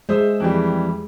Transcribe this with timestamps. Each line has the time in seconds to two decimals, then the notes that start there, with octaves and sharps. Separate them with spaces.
0.09 G#3 C5 E5 D#6
0.40 F2 E3 G3